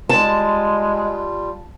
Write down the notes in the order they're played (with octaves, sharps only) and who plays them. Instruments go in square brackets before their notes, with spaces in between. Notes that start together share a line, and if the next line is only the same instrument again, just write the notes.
[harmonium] G3 F4 [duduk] G#3 [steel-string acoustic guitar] A5